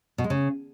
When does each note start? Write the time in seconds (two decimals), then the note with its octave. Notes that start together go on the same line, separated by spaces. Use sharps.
0.18 B2
0.24 G#3
0.30 C#3